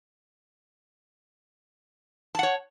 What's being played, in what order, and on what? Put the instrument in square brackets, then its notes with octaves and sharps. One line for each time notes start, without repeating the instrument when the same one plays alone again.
[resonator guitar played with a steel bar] A5
F#5
C#5